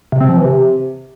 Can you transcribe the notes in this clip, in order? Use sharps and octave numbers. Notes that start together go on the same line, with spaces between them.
C3
C4
F3
E3
C3